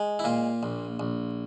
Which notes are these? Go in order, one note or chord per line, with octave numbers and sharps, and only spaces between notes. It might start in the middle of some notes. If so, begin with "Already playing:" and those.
Already playing: G#3
E4
A#2 F4
A#1
A#1